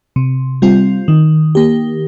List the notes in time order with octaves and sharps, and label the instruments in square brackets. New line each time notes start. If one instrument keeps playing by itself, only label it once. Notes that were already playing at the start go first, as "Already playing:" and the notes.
[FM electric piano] C3
G3 C4 F4
D#3
A#3 G4